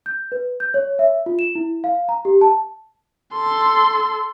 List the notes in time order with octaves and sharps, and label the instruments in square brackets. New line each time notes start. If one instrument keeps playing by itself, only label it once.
[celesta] G6
B4
G6
C#5
E5
F4
E7
E4
F5
A#5
G4
A5
[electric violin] A4 C6